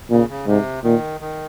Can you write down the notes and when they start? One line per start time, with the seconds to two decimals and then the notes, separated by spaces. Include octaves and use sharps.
0.10 A#2 C#3
0.29 C#3
0.47 G#2 C3
0.84 A#2 D#3
1.20 D#3